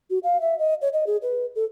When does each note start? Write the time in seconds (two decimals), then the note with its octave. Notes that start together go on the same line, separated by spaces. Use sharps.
0.10 F#4
0.24 F5
0.41 E5
0.59 D#5
0.82 C#5
0.93 D#5
1.07 G#4
1.22 B4
1.55 A4